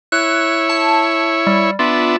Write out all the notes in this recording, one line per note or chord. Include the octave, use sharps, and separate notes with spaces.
E4 C#5 F#6
A5
G3
B3 D4 F4 E5